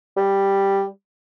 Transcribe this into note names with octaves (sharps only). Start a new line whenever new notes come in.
G3